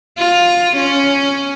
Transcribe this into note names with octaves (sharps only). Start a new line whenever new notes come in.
F4
C#4